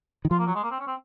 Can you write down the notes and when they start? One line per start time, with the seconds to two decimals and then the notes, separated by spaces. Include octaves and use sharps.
0.25 D#3
0.31 F3 F4
0.39 A#3
0.47 F#3
0.55 G#3
0.63 A#3
0.71 C4
0.80 C#4
0.87 C4